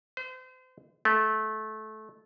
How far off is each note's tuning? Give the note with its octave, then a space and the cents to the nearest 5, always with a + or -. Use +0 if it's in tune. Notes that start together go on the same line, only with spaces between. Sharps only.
C5 -35
A3 -20